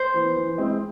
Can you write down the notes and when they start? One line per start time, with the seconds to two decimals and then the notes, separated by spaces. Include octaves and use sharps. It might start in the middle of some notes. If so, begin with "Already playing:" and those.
Already playing: C5
0.14 E3 B3
0.37 E3
0.58 G#3 C4 E4